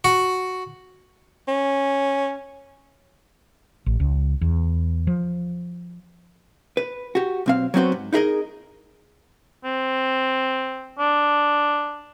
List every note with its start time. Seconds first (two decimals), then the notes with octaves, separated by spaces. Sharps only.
0.04 F#4
1.48 C#4
3.86 A1
4.00 C#2
4.41 E2
5.07 F3
6.77 B4
7.15 F#4 G4
7.46 B1 C4 F5
7.74 F#3 B3 C4 F#4 C5
7.92 G#2
8.13 D#4 E4 G#4 A#4 D#5
9.65 C4
10.99 D4